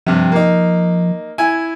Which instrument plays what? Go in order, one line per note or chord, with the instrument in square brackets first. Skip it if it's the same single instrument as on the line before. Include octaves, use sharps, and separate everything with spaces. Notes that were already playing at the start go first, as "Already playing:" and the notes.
[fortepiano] G2 C3 [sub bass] F3
[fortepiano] A#3 D#4
E4 G#5